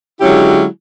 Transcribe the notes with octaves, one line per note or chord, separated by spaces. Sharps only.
D3 F#3 G#3 C#4 E4 G4